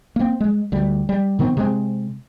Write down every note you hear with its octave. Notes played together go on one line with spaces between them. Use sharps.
A#3 C4
G#3
D2 G3
G3
C3 D#3 B3 C4
C3 G3 G#3 C4